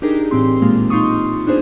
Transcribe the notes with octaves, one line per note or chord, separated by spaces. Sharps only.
D4 D#4 G4 G#4 A#4
A2 E3 C4 G4 C6
A#2 G#3 A#3 F4
D#4 F4 C6 C#6 D#6
B3 D4 D#4 G#4 C5